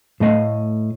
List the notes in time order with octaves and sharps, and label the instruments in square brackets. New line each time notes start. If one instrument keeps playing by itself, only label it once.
[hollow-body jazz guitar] A2 A3 D#5 F5